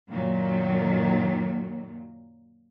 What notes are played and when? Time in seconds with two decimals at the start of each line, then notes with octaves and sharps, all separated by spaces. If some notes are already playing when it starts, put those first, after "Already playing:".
0.10 F#2 A#2 D#3 F#3